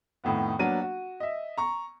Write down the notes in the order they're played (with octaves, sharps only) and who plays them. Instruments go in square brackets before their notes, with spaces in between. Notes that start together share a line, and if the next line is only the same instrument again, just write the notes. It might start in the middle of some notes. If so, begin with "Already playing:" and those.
[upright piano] F2 A2 D#3 B3
F#3 A#3 B3 D4 D#7
F#4
D#5 E5
A#5 C#6